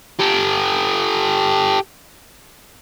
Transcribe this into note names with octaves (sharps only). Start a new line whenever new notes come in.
G4 A4